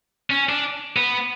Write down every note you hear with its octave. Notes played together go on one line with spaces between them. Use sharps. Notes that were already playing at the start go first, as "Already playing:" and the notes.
C#4
D4
B3